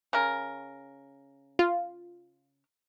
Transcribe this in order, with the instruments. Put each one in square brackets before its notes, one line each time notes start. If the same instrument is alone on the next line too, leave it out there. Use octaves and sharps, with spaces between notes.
[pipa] C#3 A#4
[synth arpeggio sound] F4